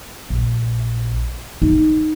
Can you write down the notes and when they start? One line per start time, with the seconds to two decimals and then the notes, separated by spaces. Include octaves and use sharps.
0.30 A#1
1.62 D#4